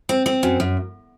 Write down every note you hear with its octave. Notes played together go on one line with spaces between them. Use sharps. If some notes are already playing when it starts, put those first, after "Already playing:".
C4
C4
F#2
F#2